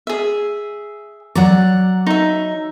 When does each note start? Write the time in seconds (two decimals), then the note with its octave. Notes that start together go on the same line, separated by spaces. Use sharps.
0.07 G#4 E5
1.35 F#3 D5 F#5 A#5
2.07 D#4 E5